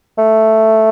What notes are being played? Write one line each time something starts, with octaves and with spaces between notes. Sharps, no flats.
A3